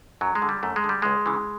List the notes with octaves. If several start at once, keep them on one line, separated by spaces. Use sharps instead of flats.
F#2 F#3
G#3
D3
G3
F#2 A3
G#3
D3
G3
C#2 G#3
C#3 E3